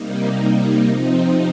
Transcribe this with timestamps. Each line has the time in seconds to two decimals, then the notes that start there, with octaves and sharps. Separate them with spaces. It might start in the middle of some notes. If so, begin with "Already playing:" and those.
Already playing: C3 G3 A#3 D#4
0.87 C3 F3 C4 D#4